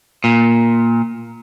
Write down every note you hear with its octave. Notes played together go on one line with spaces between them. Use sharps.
A#2